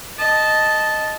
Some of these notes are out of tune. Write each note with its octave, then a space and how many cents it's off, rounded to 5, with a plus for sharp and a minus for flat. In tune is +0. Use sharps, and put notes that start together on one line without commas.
D#5 +0 A5 -10